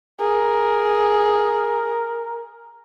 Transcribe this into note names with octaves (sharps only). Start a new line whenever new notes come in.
G#4 A#4